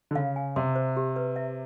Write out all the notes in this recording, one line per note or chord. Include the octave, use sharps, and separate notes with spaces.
D3
C#3 F5
G#5
C3 C6
C5
G4
B4
E5